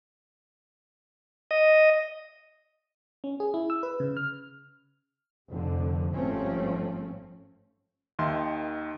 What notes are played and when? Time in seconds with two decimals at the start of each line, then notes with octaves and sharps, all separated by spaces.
1.51 D#5
3.24 C#4
3.40 G#4
3.54 E4
3.70 E6
3.83 B4
4.00 C#3
4.17 F6
5.51 F1 F2 D3
6.15 G#1 G2 F3 A3 C4 C#4
8.19 D#2 D#3 E5 C6